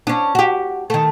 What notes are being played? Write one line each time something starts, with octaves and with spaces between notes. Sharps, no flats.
C#4 D4
F#4 G4
D#3 A3